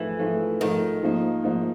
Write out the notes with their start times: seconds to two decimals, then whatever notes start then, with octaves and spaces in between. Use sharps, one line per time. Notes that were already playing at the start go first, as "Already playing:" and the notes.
Already playing: G#2 E3 F3 A3
0.19 G#2 F3 A3
0.60 G#2 D#3 F3 A3
1.02 G#2 F3 A#3 D#4
1.43 G#2 F3 A#3 D#4